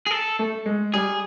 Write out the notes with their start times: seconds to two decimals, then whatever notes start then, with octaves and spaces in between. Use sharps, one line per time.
0.07 G#4
0.11 A4
0.39 A3
0.66 G#3
0.94 G3 G#4